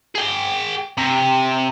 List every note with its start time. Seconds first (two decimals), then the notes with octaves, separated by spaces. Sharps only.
0.15 G#4 G5
0.98 C3